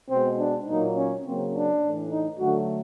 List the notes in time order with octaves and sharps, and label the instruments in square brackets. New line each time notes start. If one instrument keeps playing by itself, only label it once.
[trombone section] B2 G#3 C4
D4
A#2 F#3 A#3 D#4
C#4
C#3 F#3 A#3 C4
D4
A2 E3 A3
D#4
D3 F#3 A3 F#4